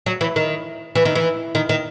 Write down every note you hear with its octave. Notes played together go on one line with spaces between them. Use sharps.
F#3
E3
D#3
E3
D#3
E3
D#3
D#3